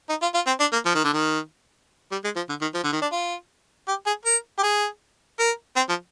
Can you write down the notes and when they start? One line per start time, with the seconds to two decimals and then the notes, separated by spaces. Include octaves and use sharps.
0.09 D#4
0.22 F4
0.34 F4
0.47 C4
0.60 D4
0.73 A#3
0.85 F3
0.95 D#3
1.04 D3
1.13 D#3
2.12 G3
2.24 G#3
2.36 F3
2.49 D3
2.61 D#3
2.74 F3
2.84 D3
2.93 D#3
3.02 D4
3.12 F4
3.88 G4
4.06 G#4
4.25 A#4
4.58 G4
4.63 G#4
5.39 A#4
5.76 C4
5.89 F3